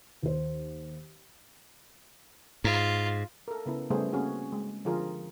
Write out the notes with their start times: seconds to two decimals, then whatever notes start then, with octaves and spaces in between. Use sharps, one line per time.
0.23 D#2 C5
2.64 G#2 F4
3.48 A4 A#4
3.66 C#3 B3 E4
3.90 C#3 G3 A3 B3 G#4 C5
4.13 A#3 C4 C#4 F#4 G#4
4.52 G#3
4.85 D3 F3 F4 G#4 A#4